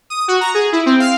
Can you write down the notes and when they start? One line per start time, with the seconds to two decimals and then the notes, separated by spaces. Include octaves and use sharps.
0.10 D#6
0.28 F#4
0.41 A#5
0.54 G#4
0.72 E4
0.86 C4
1.00 F5